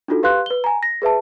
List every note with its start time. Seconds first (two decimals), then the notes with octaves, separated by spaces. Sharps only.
0.08 D4 D#4 F4 F#4 A4
0.23 G4 B4 F5 C6 F#6
0.46 B4 G7
0.64 G#5 A#5
0.83 A#6
1.02 G#4 B4 E5 A5